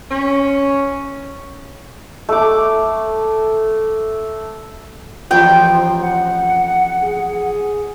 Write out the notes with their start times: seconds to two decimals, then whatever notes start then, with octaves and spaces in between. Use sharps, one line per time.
0.11 C#4
2.29 A3 D6
5.31 A1 F2 C5 G5
6.01 F#5
7.03 G#4